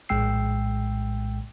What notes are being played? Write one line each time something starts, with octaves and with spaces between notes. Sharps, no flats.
A#1 A2 G#3 G5 E6 C7